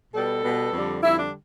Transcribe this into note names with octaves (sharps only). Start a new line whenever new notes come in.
B2 G3 B3 A4
B2 G3 B3
F2 D3 G3
F2 D3 G3 E4
D4